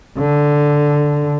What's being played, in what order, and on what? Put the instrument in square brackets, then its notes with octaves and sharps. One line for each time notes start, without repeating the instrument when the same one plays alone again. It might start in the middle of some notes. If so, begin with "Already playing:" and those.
[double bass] D3